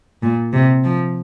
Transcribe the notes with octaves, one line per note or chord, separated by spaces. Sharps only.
A#2
C3
F3